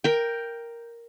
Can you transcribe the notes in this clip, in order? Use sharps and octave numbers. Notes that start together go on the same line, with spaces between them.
A#4 G5